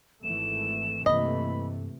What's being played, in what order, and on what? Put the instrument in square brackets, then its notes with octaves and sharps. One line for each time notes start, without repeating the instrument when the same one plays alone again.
[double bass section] G#1 E3 A3 [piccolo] E7
[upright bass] G2 A#3 [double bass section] C3 E3 A3 [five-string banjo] D#5 [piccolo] B5